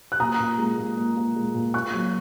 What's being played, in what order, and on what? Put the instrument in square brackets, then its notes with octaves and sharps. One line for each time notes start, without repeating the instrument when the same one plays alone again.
[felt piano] F#6
A#2 A#5 D#6
A#2
G#3
A#2
A#2
A#2
G#3
A#2
A#3 C#6 F#6
F#3